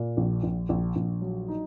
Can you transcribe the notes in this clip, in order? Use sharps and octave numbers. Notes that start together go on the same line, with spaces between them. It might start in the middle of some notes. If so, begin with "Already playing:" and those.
Already playing: A#2
A#1
A#1
A#1
A#1
F#3
D#4